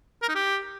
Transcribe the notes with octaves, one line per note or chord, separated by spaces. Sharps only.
A#4
D#4
G4